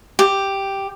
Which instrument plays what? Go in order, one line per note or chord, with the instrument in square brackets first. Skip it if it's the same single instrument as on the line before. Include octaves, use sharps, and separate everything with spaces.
[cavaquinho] G4